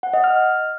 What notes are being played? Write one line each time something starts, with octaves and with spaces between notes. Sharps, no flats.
F#5
D#5
F6